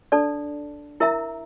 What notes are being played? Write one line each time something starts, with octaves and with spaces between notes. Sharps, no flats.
D4 A4 D5 A5
E4 A#4 E5 A#5